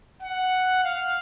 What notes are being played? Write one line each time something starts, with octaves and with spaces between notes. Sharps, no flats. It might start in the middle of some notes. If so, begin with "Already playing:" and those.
F#5
F5